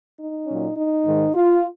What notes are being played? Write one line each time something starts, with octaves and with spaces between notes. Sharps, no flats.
D#4
A#2 F#3 C#4
D#4
G#2 D#3 G#3
F4